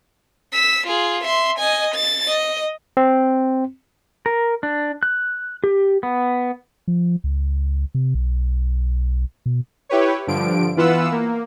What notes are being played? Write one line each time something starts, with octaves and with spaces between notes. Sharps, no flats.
E6 B6
F4 G#4
E5 C6
D#5 G#5
A6
D#5
C4
A#4
D4
F#6
G4
B3
F3
C#2
C3
B1
B2
E4 G4 B4 C#5
G2 D3 F3 D7
E3 B3 F4 B4 F#5 E6
A#3